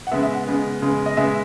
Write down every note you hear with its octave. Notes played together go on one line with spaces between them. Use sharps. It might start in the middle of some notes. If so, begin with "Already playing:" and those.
F#5
C#3 G#3 B3 E5
E5
F#5
C#3 G#3 B3
C#3 G#3 B3
D#5
C#3 G#3 B3 E5